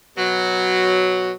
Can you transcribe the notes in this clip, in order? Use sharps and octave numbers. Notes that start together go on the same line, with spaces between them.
B2 F#3